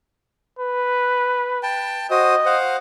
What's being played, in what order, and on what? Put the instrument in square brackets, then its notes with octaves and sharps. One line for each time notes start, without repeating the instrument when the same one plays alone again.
[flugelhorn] B4
[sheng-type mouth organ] G5 A5
[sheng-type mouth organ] F#4 C5 D#6 [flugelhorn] D#5
[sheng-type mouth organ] C5 F5 F#5